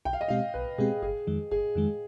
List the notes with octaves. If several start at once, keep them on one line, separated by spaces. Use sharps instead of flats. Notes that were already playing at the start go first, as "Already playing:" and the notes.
B1 G5
F5
D#5
B2 G#3 C4 G4 F5
B1 B4
B2 G#3 C4 G4 G#4
G1 G#4
F2 D#3 G#3
G1 G#4
F2 D#3 G#3